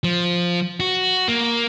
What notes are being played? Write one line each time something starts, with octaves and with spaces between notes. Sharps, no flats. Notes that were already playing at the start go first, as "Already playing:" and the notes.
F3
F#4
A#3